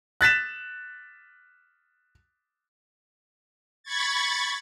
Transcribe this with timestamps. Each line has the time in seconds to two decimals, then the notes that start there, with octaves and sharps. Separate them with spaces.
0.21 F#6 A6 B6 E7
3.83 B5 C#6 G#6 A6